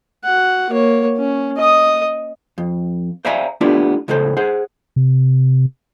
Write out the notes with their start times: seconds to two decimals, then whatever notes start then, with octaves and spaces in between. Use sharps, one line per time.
0.25 F#4 F#5
0.70 A#3 C#5
1.17 C#4
1.58 D#5 D#6
2.58 F2
3.25 C5 D5 E5 F5 G#5 A#5
3.61 A3 B3 D4 E4 F4 G4
4.08 C#2 A2 C#3 A4 C5
4.37 G#4 C5 F#5
4.96 C3